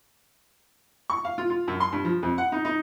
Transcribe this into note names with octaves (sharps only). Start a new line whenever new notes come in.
C#6
F5
F4
F4
F#2
C6
G2
F3
F2
F#5
D#4
D#4